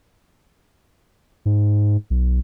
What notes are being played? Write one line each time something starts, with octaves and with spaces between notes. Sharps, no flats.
G#2
B1